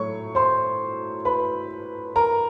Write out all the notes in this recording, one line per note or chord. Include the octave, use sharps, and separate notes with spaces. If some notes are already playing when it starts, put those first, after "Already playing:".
Already playing: A2 F#3 A3 C#5 C#6
C5 C6
B4 B5
A#4 A#5